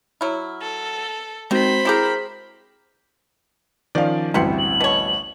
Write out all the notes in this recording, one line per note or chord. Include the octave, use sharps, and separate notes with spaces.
F#3 E4 F6
A4
D#3 G#3 C4 F#4 C5 B5
E4 G4 G#4 A#4 A#5
D#3 F3 C#4 D5 F5
A1 D2 G2 C4 E4 G4 F#5 C6
F#7
B2 C#5